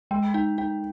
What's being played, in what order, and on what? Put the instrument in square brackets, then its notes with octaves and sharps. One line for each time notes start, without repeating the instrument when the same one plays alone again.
[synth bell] G#3 [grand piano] G5
[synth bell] D#4 [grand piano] G5
[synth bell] D#4 [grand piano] G5